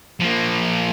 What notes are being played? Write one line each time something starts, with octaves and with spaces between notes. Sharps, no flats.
F3 A#3